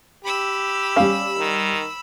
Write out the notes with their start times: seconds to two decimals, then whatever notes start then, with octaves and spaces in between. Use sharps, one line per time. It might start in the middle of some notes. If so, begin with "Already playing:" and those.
0.25 G4 B5 E6
0.96 G3 C#4 F5 D6
1.38 D#3